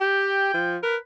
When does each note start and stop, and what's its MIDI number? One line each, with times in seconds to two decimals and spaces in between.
0.01 0.50 67
0.01 0.75 79
0.54 0.77 53
0.83 0.96 70
0.83 0.96 71